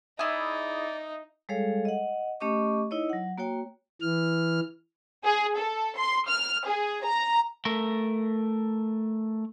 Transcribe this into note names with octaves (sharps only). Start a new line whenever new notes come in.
D#4 E4 G#4 D5 E5 D#6
G3 G#3 G#4 A4 C#5 F5
D#5 F#5
A3 C#4 G4 D#5 C#6 D6
D#4 E4 C#5 D#5
F#3 F#5
A#3 F#4 C#5 G5
E3 F6
G#4
A4
C6
F6
G#4
A#5
A3 A#4